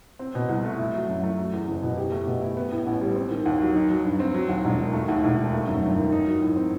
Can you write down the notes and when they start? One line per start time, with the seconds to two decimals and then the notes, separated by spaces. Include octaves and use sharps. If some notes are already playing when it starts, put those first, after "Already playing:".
0.19 C4
0.35 B2
0.49 C2
0.64 A3
0.79 E4
0.94 F#3
1.09 F#2
1.23 A3
1.39 F#3
1.53 E2
1.68 F#1
1.82 B2
1.98 G4
2.12 A3
2.27 B2
2.41 E4
2.57 B3
2.72 A2
2.86 A1
3.01 G3
3.16 C4
3.31 D#3
3.46 D#2
3.61 F#3
3.75 D#4
3.90 F#3
4.05 G2
4.20 C4
4.34 F#3
4.49 D#2
4.65 E1
4.78 D#3
4.93 A3
5.09 D#2
5.24 E1
5.38 D#3
5.53 A3
5.67 F#2
5.83 G1
5.98 D#3
6.12 D#4
6.27 F#3
6.42 A2
6.56 C4